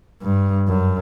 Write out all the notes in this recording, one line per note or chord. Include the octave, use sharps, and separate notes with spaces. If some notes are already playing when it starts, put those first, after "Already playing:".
G2
F#2